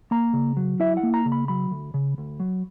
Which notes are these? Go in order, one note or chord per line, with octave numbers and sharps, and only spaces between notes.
A#3 A#5
C#3
F#3
E4 E5
F#5
A#3
A#5
C#3
B5
F#3 B5
D2
C#3
D2
F#3